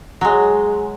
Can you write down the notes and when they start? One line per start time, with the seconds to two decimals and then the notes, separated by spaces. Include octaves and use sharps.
0.21 F#3 G#3